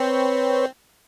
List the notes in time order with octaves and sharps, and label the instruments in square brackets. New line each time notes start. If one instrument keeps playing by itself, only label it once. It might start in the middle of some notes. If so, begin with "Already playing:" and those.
Already playing: [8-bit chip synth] C4 [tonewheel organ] B4 C#5